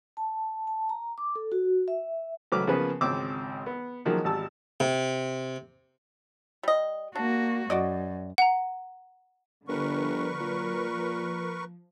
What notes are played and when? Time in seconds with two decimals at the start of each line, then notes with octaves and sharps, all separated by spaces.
0.17 A5
0.67 A5
0.89 A#5
1.18 D6
1.36 A4
1.52 F#4
1.88 E5
2.52 C#2 F#3 A3 B4 D6 F6
2.67 C#3 F3 A#3 B3 G#4 B4
3.01 G#1 C#2 C4 D6 E6
3.66 B3
4.05 D#3 F3 F#3 G#3 A#3
4.24 G#1 G3 A5 E6
4.80 C3
6.63 G3 D#5
7.15 A#3 D4 F#4
7.70 F#2 F#4 D5 D#5
8.38 F#5 A#5
9.68 G1 D3 F3 A#4 B4 C#6
10.40 A#2 F#3
10.90 F3